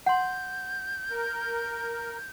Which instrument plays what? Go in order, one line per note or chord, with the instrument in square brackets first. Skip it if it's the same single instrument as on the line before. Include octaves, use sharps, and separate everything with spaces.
[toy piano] F#5 C6 [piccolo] G6
[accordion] A#4